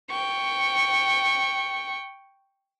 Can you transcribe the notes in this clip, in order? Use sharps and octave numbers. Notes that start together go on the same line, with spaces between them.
G5 C#6